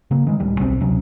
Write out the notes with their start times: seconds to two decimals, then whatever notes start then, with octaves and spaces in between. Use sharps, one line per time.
0.11 C#3 A#3
0.27 D#3 G#3
0.40 D1 G3
0.59 B1 B2 G3 C4
0.81 D2 C3 F#3 C#4